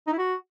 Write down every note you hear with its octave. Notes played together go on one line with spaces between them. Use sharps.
D#4
E4
F#4